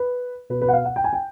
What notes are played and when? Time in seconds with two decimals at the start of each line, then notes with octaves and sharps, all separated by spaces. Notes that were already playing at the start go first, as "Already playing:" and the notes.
Already playing: B4
0.50 B2 B4
0.61 B4
0.68 F#5
0.73 F5
0.85 F#5
0.96 G5
1.04 G#5
1.13 G5